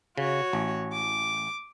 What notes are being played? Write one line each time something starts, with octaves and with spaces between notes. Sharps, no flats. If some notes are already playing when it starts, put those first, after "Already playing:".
C#3 F#4 C#5
A1
D6